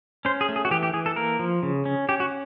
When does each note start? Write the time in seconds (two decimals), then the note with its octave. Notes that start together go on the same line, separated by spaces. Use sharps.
0.25 C#4 C5
0.41 G#4
0.49 A3
0.56 G#4
0.65 F#4
0.71 E3 G4
0.83 G4
0.93 E3 G#4
1.06 A4
1.16 A#3 A#4
1.39 F3
1.63 C#3
1.86 C#4
2.09 C#4 G4
2.20 F#4